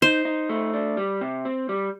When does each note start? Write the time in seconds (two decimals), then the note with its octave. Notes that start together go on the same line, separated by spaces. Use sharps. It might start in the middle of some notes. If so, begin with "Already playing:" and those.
0.02 D#4 C5
0.25 D#4
0.49 A3
0.74 D4
0.97 G3
1.21 C3
1.45 C4
1.69 G3